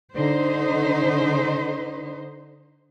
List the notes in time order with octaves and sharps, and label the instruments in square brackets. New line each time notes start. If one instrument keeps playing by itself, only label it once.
[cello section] D3 D#4 C5